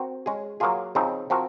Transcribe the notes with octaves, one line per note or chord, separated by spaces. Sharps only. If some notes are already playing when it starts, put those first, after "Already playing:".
Already playing: C4 F#4 A#4
G#3 C#4 G#4
F#3 A#3 F4 G#4
C#3 F3 C4 D#4
F3 C4 F#4 A#4